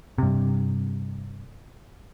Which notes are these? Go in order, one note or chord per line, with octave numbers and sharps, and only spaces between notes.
G2 C3